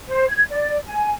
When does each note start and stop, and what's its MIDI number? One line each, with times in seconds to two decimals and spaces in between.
0.07 0.24 72
0.28 0.42 92
0.50 0.77 74
0.85 1.11 80